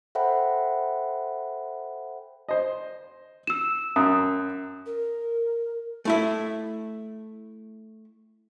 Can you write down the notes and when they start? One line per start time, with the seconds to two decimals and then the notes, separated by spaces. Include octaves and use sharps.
0.15 A4 C5 E5 F#5 G5 B5
2.48 C5 D#5
3.47 E6 E7
3.96 F#2 D#6
4.86 A#4
6.05 A3 E4 E5